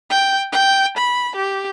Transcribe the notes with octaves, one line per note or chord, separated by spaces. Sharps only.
G5
G5
B5
G4